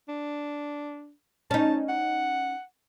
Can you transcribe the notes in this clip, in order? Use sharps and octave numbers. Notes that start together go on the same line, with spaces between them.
D4
C#4 D#4 A5
F#5